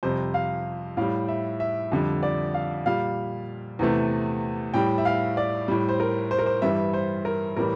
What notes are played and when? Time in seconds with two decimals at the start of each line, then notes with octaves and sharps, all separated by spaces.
0.03 F2 C3 G3 C5
0.34 F5
0.97 A2 G3 F5
1.28 E5
1.60 E5
1.92 F2 D3 G3
2.23 D5
2.54 F5
2.86 A#2 G3 F5
3.79 E2 C3 E3 A3
4.74 A2 G3 G5
4.98 E5
5.05 F5
5.37 D5
5.68 A2 G3
5.89 C5
6.00 A#4
6.31 C5
6.39 A#4
6.46 C5
6.62 G2 E3 G3 E5
6.94 C5
7.25 A#4
7.56 A2 E3 G3 A#4